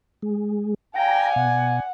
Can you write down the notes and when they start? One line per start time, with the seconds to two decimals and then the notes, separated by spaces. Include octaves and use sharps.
0.22 G#3
0.96 D5 F5 G5 G#5 A#5
1.36 B2 F#5